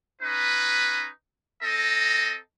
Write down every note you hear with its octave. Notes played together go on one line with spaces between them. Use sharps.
C#4 D#4 B4
C4 A4 D#5 A#5